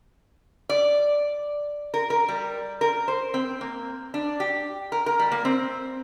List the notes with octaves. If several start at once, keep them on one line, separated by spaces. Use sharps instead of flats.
D5
A#4
A#4
G3
A#4
C5
C4
A#3
D4
G4
A#4
A#4
G3
A#3
C4